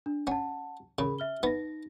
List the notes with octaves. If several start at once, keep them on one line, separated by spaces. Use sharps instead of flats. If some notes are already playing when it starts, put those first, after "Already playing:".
D4
C#4 F#5 A5
C#3 G#4 A#4 B5
E5 F6 G7
B3 D#4 A#6